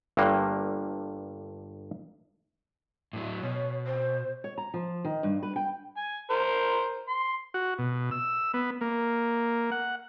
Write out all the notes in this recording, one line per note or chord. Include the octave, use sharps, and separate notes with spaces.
G1 G2 D3 A#3
A2 F#3
B2 C#5
C5
C#5
A#5
F3
D#3
G2
B4
G5
G#5
A#4 C5
C6
F#4
B2
E6
B3
A#3
F#5